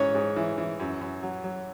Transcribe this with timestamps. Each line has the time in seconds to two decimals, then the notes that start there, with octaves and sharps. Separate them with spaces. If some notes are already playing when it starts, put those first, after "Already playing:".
Already playing: G#2 E3 C#4 C#5
0.15 G#2
0.36 E3
0.58 E3
0.80 F#2
1.01 F#2
1.23 F#3
1.44 F#3